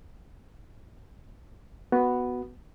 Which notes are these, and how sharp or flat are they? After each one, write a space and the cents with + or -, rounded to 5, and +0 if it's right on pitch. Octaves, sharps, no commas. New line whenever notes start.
B3 +0 F#4 +0